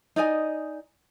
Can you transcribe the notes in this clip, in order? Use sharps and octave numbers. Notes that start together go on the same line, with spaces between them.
D#4 D5 D#5 G#5